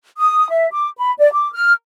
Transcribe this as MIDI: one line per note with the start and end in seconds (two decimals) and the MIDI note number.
0.17 0.49 87
0.49 0.67 76
0.72 0.88 86
0.98 1.13 83
1.18 1.31 74
1.33 1.51 86
1.53 1.72 89